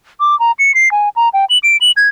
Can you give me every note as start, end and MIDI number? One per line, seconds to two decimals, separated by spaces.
0.20 0.38 86
0.40 0.52 82
0.59 0.74 97
0.75 0.91 96
0.91 1.09 80
1.16 1.29 82
1.34 1.45 79
1.50 1.58 102
1.63 1.77 98
1.81 1.91 102
1.97 2.09 92